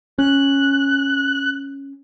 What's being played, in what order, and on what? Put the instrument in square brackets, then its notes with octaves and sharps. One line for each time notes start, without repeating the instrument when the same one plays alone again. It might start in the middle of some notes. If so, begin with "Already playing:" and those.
[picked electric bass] C#4 [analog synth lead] F#6